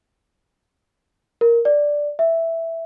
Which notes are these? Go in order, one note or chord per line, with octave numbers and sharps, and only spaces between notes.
A#4
D5
E5